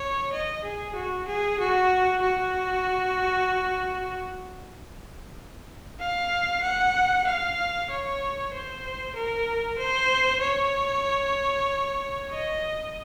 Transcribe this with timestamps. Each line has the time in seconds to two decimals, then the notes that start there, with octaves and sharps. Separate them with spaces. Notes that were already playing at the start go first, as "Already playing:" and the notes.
Already playing: C#5
0.33 D#5
0.64 G#4
0.96 F#4
1.28 G#4
1.60 F#4
2.22 F#4
6.00 F5
6.63 F#5
7.27 F5
7.90 C#5
8.53 C5
9.15 A#4
9.78 C5
10.41 C#5
12.31 D#5